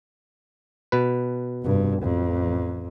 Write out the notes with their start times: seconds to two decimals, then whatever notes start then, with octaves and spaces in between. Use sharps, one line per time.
0.92 B2 B4
1.64 F1 G2
1.98 A1 F2